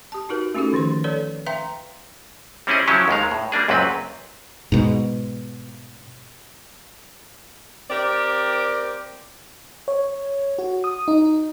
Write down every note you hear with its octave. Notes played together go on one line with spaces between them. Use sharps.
G4 A5
D#4 F#4 A#4 B4
A3 C#4 D#4 F#4 G4 A4
D3 D#3 F3 C6
A4 B4 C#5 D5
B4 E5 F5 G5 A#5 C6
G3 C4 C#4 E4 G#4 D#5
C#3 F3 F#3 C#4 E4 G4
D#2 D#3 G#3 F5
A2
G3 A#3 D4 G#4
C#2 F#2 A#2 F#3 C4 B4
G#2 B2
C4 G4 A#4 D5
C#5
F#4
D#6
D#4